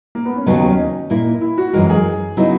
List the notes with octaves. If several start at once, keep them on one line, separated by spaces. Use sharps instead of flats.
A#3
B3
C#4
D#2 C#3 F#3 B3 D#4
D#4
C#4
D#4
A#2 A#3 E4
E4
F#4
F#2 E3 G#3 A#4
G#4
C#3 F#3 B3 D#4 E4